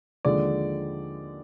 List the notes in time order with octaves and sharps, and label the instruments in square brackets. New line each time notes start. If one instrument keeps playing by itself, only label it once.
[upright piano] D#2 D3 F3 G#3 D5